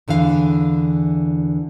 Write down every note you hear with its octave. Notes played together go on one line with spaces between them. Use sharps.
E2 D3 E3 F5